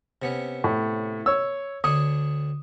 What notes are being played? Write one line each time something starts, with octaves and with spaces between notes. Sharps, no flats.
C3 B3 C#4
A2
C#5 E6
D2 D4 C#5 D#6